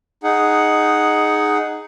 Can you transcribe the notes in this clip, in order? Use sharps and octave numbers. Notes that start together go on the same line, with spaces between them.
D#4 G#4 F#5